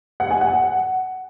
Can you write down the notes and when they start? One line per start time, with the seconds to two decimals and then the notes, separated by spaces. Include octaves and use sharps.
0.20 F#5
0.31 G#5
0.41 F#5